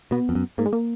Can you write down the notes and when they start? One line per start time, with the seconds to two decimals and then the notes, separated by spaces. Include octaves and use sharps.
0.11 B2 B3
0.29 F2
0.35 F#2
0.58 G#2 A#3
0.66 G#3
0.73 A#3